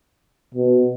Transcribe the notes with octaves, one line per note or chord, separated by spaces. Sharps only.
B2